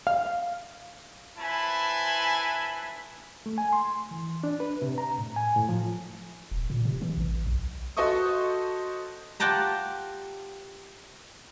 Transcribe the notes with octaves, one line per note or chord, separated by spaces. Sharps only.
F5
E4 B4 C5 G#5 A5 B5
A3
G#5
C6
E3
D4
B4
C3
A#5
A2
G#5
A2
F3
D#1
A#2
C3
E3
A1
B1
F#4 A4 C5 D#5 C#6 D#6
F4 G4 F#5 G5 A5 A#5